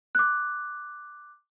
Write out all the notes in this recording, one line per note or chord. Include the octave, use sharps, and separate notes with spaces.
D6 F#6